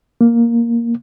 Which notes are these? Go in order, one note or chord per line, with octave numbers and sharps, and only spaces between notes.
A#3